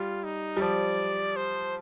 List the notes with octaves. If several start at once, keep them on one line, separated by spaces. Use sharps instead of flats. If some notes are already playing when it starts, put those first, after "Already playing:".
Already playing: G3 F4
D#4
G3
F3 D5
C5